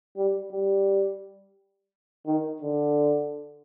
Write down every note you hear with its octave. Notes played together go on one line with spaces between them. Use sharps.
G3
G3
D#3
D3